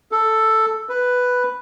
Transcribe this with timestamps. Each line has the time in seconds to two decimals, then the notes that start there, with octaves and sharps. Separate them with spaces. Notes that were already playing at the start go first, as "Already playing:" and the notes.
0.12 A4
0.89 B4